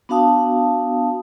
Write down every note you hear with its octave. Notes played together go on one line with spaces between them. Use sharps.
B3 D4 F#4 F5 A5 D#6